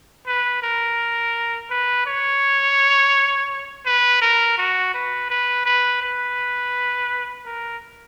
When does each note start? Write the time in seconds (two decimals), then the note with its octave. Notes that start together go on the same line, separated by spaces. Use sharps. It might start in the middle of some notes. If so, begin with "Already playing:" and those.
0.27 B4
0.63 A#4
1.70 B4
2.06 C#5
3.86 B4
4.22 A#4
4.58 F#4
4.94 B4
5.30 B4
5.66 B4
6.02 B4
7.45 A#4